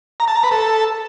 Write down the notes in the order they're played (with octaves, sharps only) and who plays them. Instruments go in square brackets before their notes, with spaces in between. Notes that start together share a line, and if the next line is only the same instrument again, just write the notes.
[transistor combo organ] A#5
A5
A#5
B4
A4